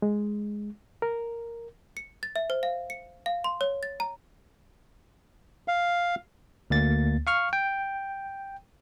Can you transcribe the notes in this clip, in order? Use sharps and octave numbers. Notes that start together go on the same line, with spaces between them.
G#3
A#4
C#7
A6
E5
C5
F5
C#7
F5
C6
C#5
A6
A#5
F5
D2 A#3 A6
F5 C#6 F6
G5